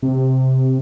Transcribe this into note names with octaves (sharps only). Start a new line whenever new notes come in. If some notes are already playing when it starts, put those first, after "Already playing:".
C3